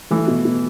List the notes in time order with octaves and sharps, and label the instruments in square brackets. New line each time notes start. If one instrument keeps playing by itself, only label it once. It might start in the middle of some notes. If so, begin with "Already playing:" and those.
[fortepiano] E3 [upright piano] A3
[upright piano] B2
B2